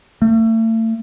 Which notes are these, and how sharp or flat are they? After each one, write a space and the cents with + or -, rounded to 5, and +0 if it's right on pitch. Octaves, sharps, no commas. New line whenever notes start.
A3 +35